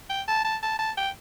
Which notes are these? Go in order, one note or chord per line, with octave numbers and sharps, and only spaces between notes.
G5
A5
A5
A5
A5
G5